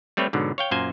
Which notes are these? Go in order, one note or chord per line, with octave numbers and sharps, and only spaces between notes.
G3 A3 C4 B4 C#5
G#2 B2 D3 F#3
C#5 F5 G5
F#2 A#2 A#3 C5 G#5